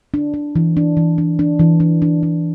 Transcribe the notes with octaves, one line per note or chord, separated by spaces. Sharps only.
D4
D4
E3
D4
E3
D4
D4
E3
D4
D4
D4